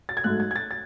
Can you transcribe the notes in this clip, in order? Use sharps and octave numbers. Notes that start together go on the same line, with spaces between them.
A6
G#6
G#2 F#3 A3 F#6
G#6
G#6
A6
A6